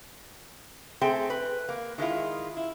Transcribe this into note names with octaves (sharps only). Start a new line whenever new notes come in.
A3 C4 G#4 G5
B4
A#3
D#3 G#3 E4 F4
E4